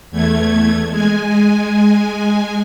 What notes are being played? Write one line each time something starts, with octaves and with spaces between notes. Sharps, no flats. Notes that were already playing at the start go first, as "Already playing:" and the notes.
E2 A3 G#6
G#3 G#5